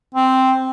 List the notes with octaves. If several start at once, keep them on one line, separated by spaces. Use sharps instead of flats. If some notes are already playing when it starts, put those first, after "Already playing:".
C4